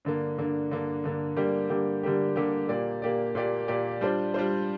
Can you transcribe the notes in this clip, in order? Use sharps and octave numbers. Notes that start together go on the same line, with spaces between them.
G2 D3 A#3
G2 D3 A#3
G2 D3 A#3
G2 D3 A#3
D3 G3 A#3 G4
D3 G3 A#3 G4
D3 G3 A#3 G4
D3 G3 A#3 G4
A#2 A#3 G4 D5
A#2 A#3 G4 D5
A#2 A#3 G4 D5
A#2 A#3 G4 D5
G3 D4 F4 C5
G3 D4 F4 C5